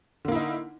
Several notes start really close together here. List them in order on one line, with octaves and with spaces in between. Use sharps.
D3 A#3 E4 D#4